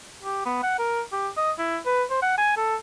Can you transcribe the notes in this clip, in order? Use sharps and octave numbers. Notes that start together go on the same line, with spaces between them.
G4
B3
F#5
A#4
G4
D#5
E4
B4
C5
F#5
G#5
A4